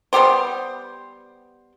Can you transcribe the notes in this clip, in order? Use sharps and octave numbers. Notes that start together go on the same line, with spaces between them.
G3 B3 G4 C5